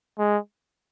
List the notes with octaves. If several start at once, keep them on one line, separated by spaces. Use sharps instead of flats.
G#3